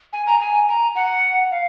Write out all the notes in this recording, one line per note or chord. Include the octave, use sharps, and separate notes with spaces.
G#5
A#5
G#5
A#5
F#5
F5